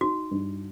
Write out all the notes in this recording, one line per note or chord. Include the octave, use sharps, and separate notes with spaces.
D#4 F#4
G2